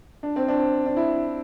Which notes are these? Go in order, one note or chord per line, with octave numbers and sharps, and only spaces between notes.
D4
C4
D4
D4
E4